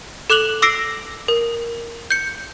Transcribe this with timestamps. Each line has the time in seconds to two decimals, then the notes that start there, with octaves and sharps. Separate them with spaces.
0.30 A4 D6 F#6 F7 F#7
0.62 D6 E6 A#6 C7 D7
1.28 A#4
2.10 G6 C#7